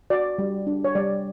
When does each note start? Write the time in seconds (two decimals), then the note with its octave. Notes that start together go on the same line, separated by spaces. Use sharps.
0.10 F#4 D5
0.39 G3
0.67 D4
0.84 C#5
0.95 G3 D5